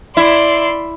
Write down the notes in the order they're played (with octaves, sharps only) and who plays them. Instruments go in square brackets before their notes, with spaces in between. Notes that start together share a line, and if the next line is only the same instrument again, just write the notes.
[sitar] E4 [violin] D5 C6